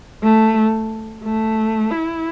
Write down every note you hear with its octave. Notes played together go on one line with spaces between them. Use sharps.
A3
A3
E4